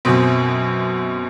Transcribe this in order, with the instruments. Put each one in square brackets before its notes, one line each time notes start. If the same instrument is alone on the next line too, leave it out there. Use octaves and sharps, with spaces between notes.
[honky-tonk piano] F#2 B2 C4